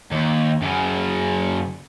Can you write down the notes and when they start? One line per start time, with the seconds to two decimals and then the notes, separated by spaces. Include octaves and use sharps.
0.11 D#2
0.62 F#2 C#3